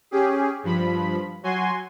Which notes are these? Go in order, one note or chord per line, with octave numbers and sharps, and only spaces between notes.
C#4 G4 G#4
G2 F3 B5
F#3 F#4 G#5 C6